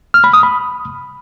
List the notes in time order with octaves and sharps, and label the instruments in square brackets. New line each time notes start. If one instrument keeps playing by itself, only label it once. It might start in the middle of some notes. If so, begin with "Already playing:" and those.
[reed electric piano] F6
B5
D#6
B5